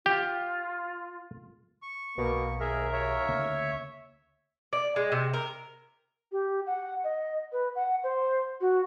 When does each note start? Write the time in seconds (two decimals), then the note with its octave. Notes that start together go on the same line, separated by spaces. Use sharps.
0.06 F4 G4
1.82 C#6
2.18 B1 B2 A#3
2.60 D#2 G#4 A#4 E5
2.93 C#5 E5
3.29 D2 C#3 A#3
4.73 D5
4.96 G#3
5.12 C3
5.34 A#4
6.32 G4
6.66 F#5
7.04 D#5
7.52 B4
7.75 F#5
8.04 C5
8.61 F#4